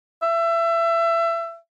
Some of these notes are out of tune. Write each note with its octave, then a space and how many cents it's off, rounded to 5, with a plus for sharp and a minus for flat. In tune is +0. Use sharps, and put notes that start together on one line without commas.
E5 +25